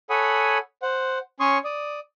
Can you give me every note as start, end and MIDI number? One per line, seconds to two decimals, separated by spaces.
0.10 0.58 69
0.10 0.58 73
0.10 0.58 78
0.10 0.58 80
0.10 0.58 83
0.10 0.58 87
0.82 1.18 72
0.82 1.18 78
1.40 1.58 61
1.40 1.58 73
1.40 1.58 84
1.40 1.58 85
1.40 1.58 87
1.64 2.00 74
1.64 2.00 87